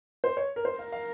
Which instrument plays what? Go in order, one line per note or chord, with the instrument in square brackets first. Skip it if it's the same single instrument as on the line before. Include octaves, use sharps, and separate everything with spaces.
[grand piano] C5
C#5
A#4
C5
[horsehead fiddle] A#4 [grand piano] F5
[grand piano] F5